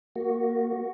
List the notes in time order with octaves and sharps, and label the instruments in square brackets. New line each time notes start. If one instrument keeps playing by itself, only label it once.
[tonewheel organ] A#3 F#4